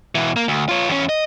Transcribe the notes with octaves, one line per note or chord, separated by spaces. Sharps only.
B2 E3
A#3
D2
F4 C#5
E2 C#4
D#5